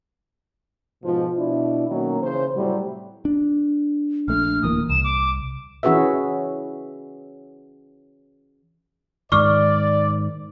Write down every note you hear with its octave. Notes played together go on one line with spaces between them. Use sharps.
G#2 B2 F3
B2 D4 E4
B2 D#3 F#3 A#3 C#4
C#3 E3 C5
A2 C3 F#3 G3
D4
A#1 A3 D4 F6
D1 E3 A#3 D#6
C2 E7
D6
E3 C#4 F#4 G#4 B4 E5
G#2 D#3 D5 C#6 D6 F6